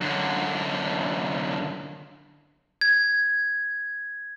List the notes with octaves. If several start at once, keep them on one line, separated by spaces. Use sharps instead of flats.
F#2 D3
G#6